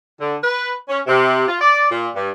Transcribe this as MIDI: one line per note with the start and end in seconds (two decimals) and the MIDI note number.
0.20 0.36 50
0.43 0.74 71
0.88 1.00 61
1.07 1.46 48
1.47 1.58 65
1.61 1.88 74
1.90 2.08 46
2.15 2.30 43